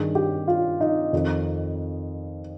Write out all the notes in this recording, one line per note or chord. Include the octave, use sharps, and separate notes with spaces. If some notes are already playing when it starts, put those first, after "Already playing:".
Already playing: G2 D#3 G#4
G4
F4
D#4
F2 D#3